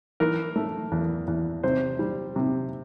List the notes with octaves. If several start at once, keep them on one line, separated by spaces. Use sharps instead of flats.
E3 A#4
A3
E2
E2
C3 C5
G3
C3